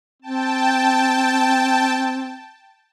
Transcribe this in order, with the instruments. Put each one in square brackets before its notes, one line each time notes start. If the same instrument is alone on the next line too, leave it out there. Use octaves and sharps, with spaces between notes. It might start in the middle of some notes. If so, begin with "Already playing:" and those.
[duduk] C4 [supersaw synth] G5 A5